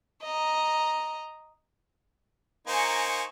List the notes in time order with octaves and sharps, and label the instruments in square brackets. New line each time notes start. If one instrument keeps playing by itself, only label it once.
[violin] D#5 A#5
[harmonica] A#3 D#4 C5 [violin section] G#5 C#6